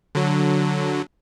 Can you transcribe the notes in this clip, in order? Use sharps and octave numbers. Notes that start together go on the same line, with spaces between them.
D3 F#3